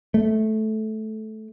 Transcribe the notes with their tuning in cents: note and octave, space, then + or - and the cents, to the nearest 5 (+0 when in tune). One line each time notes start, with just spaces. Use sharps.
A3 -15